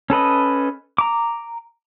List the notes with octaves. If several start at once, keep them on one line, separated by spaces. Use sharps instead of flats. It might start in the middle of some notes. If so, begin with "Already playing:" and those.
C#4 A4 B4 D#5
A#5 D6